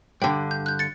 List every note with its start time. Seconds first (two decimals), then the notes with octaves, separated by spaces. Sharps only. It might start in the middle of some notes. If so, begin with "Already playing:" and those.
0.22 G2 D3 G5
0.51 G6
0.66 F#6 G6
0.79 A6 C#7